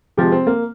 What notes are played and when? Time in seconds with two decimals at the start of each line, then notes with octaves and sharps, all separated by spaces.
0.17 C3 F3 G#3 G4
0.32 C4
0.47 A#3